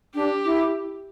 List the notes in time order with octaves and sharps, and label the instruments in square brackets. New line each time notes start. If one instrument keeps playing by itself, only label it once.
[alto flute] D4 [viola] G4
[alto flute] E4